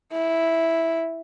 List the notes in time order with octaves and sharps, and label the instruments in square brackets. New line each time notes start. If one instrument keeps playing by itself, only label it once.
[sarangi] E4